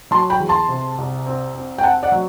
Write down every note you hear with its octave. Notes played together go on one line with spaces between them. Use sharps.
F#3 A5 C6
G5 B5
E2
A5 C6
C3
C2
C4
C4
G5
C4 F#5 A5
D5 F#5
F#3